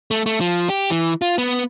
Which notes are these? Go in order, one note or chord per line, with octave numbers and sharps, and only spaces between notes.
A3
A3
F3
G4
E3
F4
B3